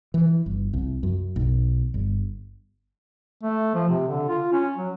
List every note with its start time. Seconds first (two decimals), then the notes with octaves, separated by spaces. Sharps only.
0.14 E3
0.46 G1
0.73 C2
1.03 F#2
1.36 B1
1.94 G1
3.43 A3
3.75 F3
3.89 C3
4.08 D3
4.28 F4
4.53 C#4
4.77 F#3